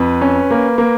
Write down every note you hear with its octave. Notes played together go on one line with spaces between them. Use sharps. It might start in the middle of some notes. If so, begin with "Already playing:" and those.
Already playing: F2 B4
C#4
A#3
A#3